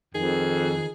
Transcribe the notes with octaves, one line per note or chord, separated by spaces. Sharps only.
F2 D#3 G#4